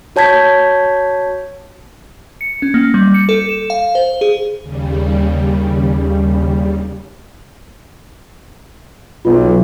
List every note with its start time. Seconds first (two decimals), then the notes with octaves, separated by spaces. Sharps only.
0.16 F#4 C#5 A5 G6 G#6 B6
2.41 C#7
2.62 C#4
2.74 A#3
2.94 G3
3.14 C#7
3.29 A4
3.49 E7
3.70 F5
3.95 C5
4.21 G#4
4.60 D#2 C#3 G3
9.25 B1 F4